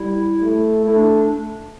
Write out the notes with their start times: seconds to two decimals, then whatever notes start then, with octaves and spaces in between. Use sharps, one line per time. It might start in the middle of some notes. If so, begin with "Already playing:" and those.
Already playing: G3 E4
0.42 A3
0.84 A3 E4
0.96 D4
1.06 D4
1.18 D4